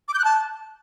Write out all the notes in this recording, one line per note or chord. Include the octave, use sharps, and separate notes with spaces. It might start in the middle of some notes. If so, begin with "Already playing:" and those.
D6
G6
F#6
A5